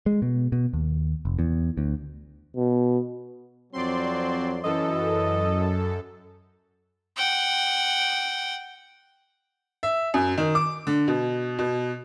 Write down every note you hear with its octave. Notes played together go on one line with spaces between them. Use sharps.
G#3
B2
B2
D#2
F1
E2
D2
B2
F2 F#3 C4 D5 C6
F#2 E3 A4 D#5
F#5 G5
E5
F#2
D#3
D6
D3
B2
B2